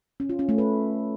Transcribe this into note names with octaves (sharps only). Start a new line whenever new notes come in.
C#4
F4
C#4
A3
B4